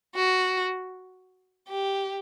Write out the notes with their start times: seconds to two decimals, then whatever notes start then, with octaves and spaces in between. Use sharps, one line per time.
0.15 F#4
1.68 G4